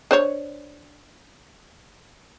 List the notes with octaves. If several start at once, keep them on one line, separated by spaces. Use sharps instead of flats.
D4 C5 C#5